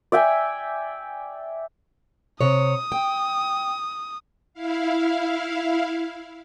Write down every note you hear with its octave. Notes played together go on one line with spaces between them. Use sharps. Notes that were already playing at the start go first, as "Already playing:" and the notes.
D5 E5 G5 G#5
C3 C#5 D#6
G5
E4 F5